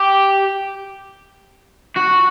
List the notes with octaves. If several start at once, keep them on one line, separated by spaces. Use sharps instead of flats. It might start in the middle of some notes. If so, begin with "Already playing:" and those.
Already playing: G4
F#4